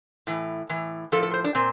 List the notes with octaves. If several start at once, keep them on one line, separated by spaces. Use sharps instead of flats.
A2 E3
A2 E3
A2 F3 A4
A4
C5
D4
A#2 C4